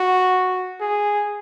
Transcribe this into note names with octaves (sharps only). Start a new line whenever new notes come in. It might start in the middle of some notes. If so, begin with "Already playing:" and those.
Already playing: F#4
G#4